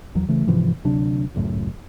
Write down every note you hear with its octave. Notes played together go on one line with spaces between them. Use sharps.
F1 D#2 E3 F#3
C#3 E3 A3
G#2 C3 E3 F3
D2 C3 F#3 D4
G#1 C#2 F#2 A2